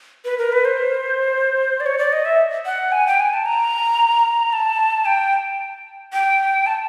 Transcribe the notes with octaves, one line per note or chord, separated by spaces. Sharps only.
B4
A#4
B4
C5
D5
C#5
D5
D#5
E5
F#5
G#5
G5
G#5
A5
A#5
A5
G5
G5
A5